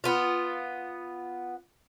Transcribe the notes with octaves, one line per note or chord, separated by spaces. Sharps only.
B3 F4